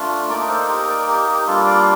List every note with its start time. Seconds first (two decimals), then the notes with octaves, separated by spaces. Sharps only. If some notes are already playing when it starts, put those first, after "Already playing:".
Already playing: A3 D4 F4
0.29 A#3 D#4 A#4 D5
0.49 A4 C5
0.68 G4 A#4
0.89 A#4 D5
1.08 G4 A#4
1.27 G4
1.47 G3 A#3 D4 F4 A4
1.66 D5 F5